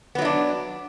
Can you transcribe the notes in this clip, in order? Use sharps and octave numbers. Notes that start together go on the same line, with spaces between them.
F#3 B3 D4 E4